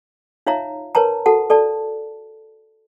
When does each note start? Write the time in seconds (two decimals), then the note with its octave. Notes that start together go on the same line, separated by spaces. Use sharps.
0.47 D#4 F4 C#5 E5 F5 A#5
0.95 A#4 B4 C#5 A5 A#5
1.26 F#4 A4 F#5 A5
1.50 A4 D5 A5